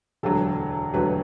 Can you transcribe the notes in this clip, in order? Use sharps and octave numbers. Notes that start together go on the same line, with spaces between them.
E1 D2 D3 F#3 A4
E1 D2 D3 F#3 B4